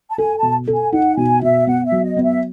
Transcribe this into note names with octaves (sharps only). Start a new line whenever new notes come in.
A5
A4 G#5
A5
B2
A4
G#5
D#4 F#5
B2 G#5
B2 E5
B3 F#5
E5
F#3
D#5
B3
E5